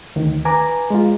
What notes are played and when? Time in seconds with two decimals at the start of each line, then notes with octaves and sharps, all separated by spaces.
0.16 D2 D#3
0.45 B4 G#5 A#5 D6
0.90 G#3 F4